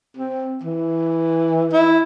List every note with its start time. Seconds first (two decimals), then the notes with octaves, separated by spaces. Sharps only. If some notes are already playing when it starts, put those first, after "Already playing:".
0.17 C4
0.64 E3
1.73 E4